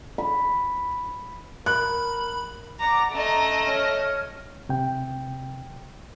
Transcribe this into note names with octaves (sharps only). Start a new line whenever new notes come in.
B5
A#4 B5 F#6
D5 F#5 A#5 D6
A3 C#4 D#5 A#5
C#5 F6
C3 G5